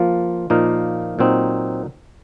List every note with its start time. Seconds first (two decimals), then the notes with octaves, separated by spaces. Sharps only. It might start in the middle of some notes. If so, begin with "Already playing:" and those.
Already playing: F3 A#3 F4
0.50 A#2 F3 A#3 D#4 A#4
1.19 A#2 F#3 C4 D#4